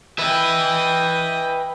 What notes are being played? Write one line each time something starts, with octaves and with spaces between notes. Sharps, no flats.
B4 D#5 E5 G5